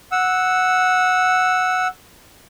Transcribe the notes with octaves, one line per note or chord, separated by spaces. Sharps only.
F#5 E6